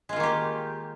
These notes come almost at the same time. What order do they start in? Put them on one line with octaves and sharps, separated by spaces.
G#3 F4 D#3 A#3 G4